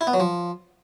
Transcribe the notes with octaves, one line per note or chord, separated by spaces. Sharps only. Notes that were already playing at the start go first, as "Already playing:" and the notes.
E4
B3
F#3
F3